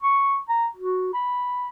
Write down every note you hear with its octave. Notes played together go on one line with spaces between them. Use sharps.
C#6
A#5
F#4
B5